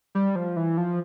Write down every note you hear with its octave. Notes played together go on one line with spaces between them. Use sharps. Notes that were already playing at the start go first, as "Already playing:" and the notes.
G3
F3
E3
F3